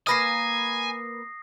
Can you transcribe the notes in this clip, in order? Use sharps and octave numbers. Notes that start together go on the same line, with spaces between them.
A#3 B4 F5 G#5 D#6 A#6 C7